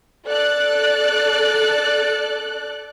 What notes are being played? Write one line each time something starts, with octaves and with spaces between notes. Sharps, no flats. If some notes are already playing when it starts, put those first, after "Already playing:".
A4 D5 F#6